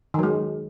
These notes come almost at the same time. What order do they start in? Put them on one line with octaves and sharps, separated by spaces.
D#3 F#3 G#3